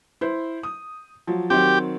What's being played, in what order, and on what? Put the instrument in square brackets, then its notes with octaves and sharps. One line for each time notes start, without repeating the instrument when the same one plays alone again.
[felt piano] E4 C5
D#6
F3 F#3
[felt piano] D#3 F#3 C4 [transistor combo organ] G4